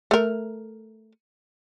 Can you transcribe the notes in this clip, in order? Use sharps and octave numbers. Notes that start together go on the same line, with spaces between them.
A3 A#4